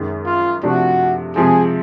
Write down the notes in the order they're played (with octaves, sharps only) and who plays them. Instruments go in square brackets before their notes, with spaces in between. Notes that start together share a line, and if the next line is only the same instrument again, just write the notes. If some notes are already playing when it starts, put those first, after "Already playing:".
Already playing: [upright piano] F#2 D#3 G#3
[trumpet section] F4
[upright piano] C3 F3 A3 D4 [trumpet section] F#4
[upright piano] C3 F3 G#3 C4 [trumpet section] G#4